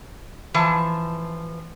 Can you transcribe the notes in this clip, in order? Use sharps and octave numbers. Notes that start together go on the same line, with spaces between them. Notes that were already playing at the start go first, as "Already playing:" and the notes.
E3 F3 A5